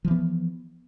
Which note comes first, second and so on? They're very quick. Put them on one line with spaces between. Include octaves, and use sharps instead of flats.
F3 E3 B3